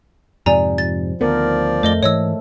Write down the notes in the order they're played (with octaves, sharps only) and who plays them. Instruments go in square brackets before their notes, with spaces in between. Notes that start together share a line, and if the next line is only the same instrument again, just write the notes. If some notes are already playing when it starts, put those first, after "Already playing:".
[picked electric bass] F2 G#2 C3 [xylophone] D5 G#5 A#5
[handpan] F3 [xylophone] A6
[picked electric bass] D2 B3 [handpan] D#3 A#4 C5 [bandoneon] F3 D5
[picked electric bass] F2 [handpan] A3 [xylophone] C5 D#5 G7
[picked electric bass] G#2 E3 [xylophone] C#5 D#5 E6